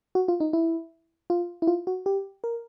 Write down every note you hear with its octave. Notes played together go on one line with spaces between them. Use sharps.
F#4
F4
D#4
E4
F4
E4
F4
F#4
G4
A#4